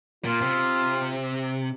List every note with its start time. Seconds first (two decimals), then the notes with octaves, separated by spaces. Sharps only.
0.24 A#2 F4
0.42 C3